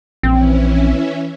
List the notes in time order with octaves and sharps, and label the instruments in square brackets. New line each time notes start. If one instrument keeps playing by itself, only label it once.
[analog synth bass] A#1 [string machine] E3 C#4 E4 [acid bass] C4